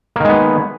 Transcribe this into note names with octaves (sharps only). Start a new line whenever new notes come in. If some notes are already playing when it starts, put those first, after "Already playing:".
D#3 G#3 A#3 B3